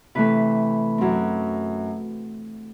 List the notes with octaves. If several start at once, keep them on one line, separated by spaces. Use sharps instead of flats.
C3 E3 A3 B4
F#2 F#3 C4